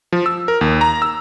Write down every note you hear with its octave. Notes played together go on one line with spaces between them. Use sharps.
F3
E6
A#4
D#2
A#5
E6